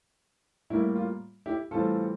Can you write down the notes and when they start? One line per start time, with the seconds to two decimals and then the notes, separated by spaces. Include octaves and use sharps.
0.70 A2 G3 A#3 E4
0.96 F4
1.46 E4 G4
1.71 A2 E3 G3 C4 F4 A4